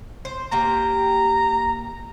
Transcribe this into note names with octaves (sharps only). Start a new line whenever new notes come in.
C5
A#3 G4 A#5